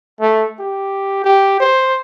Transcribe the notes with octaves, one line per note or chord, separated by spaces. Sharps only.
A3
G4
G4
C5